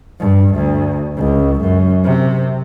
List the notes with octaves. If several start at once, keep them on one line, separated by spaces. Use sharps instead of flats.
G2
D2
C#2
F#2
C3